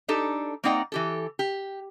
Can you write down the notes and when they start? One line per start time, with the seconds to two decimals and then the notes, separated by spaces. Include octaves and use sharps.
0.08 D4 D#4 G4 A4
0.64 A#3 C4 D#4 D5 F#5 G5
0.92 E3 G4 A4
1.39 G4